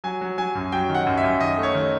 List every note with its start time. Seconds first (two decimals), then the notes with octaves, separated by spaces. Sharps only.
0.04 F#3 G#5
0.21 F#3
0.38 F#3 G#5
0.55 F#2
0.72 F#3 G5
0.89 D#3
0.95 F#5
1.06 F#2
1.17 E5
1.23 F#2
1.40 D#3 D#5
1.58 A3
1.63 C#5
1.75 D#3